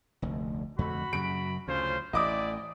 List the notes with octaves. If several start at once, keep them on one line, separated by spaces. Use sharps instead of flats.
F1 D2
F2 D3 A3 F#4 B5
F#2 C#3 D7
D2 C#3 C#4 F4 C5
A1 A3 E4 D5 D#5 D6 D#6